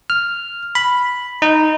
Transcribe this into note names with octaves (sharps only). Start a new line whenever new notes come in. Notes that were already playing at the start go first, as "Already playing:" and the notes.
F6
B5
D#4